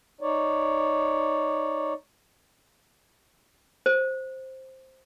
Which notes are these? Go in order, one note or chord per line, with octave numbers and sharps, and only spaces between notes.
D#4 C#5 D5
C5